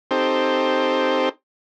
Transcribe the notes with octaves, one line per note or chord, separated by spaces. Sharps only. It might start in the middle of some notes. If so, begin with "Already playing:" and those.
C4 D#4 G4 A4 C5